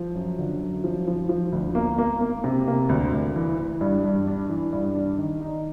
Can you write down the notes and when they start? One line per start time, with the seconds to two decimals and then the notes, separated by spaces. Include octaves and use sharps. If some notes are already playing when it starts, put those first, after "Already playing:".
Already playing: F3
0.15 F#2
0.39 D3
0.61 F#2
0.84 F3
1.08 F3
1.29 F3
1.52 D2
1.75 A#3
1.98 A#3
2.21 A#3
2.44 C3
2.67 A#3
2.89 D2
3.13 D2
3.36 E3
3.58 E3
3.81 G2
4.04 G2
4.27 D4
4.49 E3
4.73 G2
4.95 D4
5.18 D#3
5.41 D#4